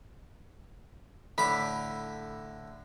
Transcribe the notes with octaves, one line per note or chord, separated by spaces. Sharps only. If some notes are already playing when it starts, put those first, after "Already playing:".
A2 D3 B5 D6